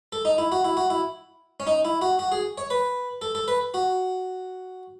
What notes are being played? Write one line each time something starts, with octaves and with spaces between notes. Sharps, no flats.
A4
D#4
E4
F#4
E4
F#4
E4
C#4
D#4
E4
F#4
F#4
G#4
C#5
B4
A4
A4
B4
F#4